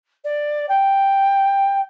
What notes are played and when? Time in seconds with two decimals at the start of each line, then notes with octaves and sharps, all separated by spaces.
0.24 D5
0.69 G5